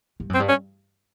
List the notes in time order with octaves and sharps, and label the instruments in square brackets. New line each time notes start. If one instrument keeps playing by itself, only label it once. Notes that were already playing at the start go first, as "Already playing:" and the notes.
[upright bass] G2
[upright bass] F#2 [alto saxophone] C4
[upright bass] G2
[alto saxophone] C#4